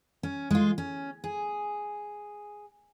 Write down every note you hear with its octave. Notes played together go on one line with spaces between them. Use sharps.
C#4
G#3 F4
C#4
G#4